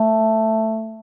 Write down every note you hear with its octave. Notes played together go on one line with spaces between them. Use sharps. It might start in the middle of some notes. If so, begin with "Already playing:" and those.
Already playing: A3